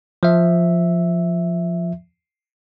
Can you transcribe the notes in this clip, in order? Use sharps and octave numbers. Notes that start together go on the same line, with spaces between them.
F3 E5